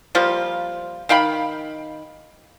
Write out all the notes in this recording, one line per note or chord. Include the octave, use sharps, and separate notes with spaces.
F3 G3 A#3 F4
D#3 F5 G5 B5